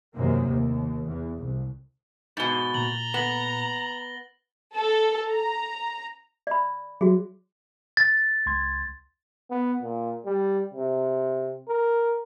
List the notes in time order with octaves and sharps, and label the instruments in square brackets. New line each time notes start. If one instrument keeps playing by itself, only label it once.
[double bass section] F1 F#2 C3 D#3 A#3
D#2
E2
C2
[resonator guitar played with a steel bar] G#2 B2 [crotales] A6 G7
[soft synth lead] A#2 [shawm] A#5 [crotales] F#7
[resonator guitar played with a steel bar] B3 [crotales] A#6 F#7
[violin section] A4
A#5
[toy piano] D5 B5
[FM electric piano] F#3 [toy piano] F#4 G#4
[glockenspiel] A6
[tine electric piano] C#2 C6 G#6
[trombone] B3
A#2
G3
C3
A#4